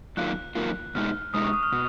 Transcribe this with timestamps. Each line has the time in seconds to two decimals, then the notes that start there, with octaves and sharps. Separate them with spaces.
0.17 F#2 D#3 A#3 F4 F#6
0.55 F#2 D#3 A#3 F4
0.95 B2 G#3 D#4 F6
1.34 B2 G#3 D#4 D#6
1.44 C#6
1.53 D#6
1.63 F6
1.72 B2 D#6